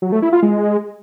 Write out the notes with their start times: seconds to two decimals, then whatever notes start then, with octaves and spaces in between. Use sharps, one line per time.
0.02 F#3
0.12 A3
0.22 E4
0.32 F4
0.43 G#3